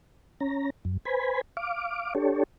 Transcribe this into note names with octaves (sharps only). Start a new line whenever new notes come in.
C#4 A#5
F#2
B4 C5 G#5 B5
F5 D6
D4 G4 A4 C#5